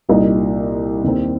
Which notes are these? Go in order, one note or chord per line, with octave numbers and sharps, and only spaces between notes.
C2 A#2 G3 D#4
D#2 D#3 C4